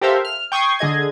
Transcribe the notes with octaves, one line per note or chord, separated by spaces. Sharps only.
G4 A4 A#4 C5 E5 F5
F6
G5 C#6 D#6 G#6 C7
D3 G#4 D#5 G#6